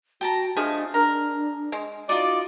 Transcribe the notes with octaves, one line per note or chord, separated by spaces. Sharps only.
F#4 G5 A5 A#5
F3 G#3 A3 D4 G#4
D4 A#4
G#3
D#4 F4 F#4 D5